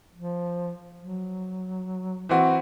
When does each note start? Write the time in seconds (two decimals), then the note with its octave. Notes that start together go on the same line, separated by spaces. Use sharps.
0.15 F3
0.99 F#3
2.29 E3 C4 F#4